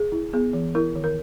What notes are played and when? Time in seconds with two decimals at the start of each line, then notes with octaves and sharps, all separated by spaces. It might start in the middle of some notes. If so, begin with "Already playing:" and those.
Already playing: G#4
0.12 E4
0.33 B3 G#4
0.53 E3
0.75 E4 A#4
0.96 D#3
1.04 A#4